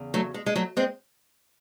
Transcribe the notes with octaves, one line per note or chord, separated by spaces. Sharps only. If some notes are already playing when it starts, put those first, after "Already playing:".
Already playing: E2 C#3
F#3 A3
G#3
G#3
F#3 A3
G#3 C4